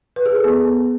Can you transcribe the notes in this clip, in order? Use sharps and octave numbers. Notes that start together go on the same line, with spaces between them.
B4
G#4
A4
B3